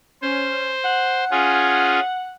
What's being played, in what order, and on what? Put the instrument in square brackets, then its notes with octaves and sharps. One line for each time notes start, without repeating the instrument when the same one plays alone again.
[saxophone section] C#4 [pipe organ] C5
[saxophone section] F#5
[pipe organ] C#4 F4 G#4